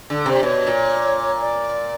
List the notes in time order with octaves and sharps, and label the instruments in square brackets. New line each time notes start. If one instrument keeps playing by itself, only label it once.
[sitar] D3 [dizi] A4
[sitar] C3 [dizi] C5
[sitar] B2 [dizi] C#5
[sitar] A#2
[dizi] D5